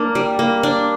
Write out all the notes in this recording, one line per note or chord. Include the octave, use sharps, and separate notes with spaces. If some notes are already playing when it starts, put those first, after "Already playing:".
Already playing: A#3 D4
G3
A#3
D4